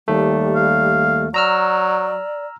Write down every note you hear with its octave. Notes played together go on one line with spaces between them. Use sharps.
D#2 G3 A3
F5
F#3 D5 A#5 E6 F6